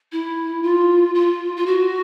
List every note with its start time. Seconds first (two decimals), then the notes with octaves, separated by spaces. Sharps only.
0.12 E4
0.63 F4
1.15 F4
1.56 F4
1.66 F#4